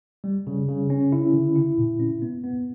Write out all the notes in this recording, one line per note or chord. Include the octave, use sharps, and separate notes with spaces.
G3
C#3
C#3
C#4
E4
D3
E4
A#2
C#4
B3
B3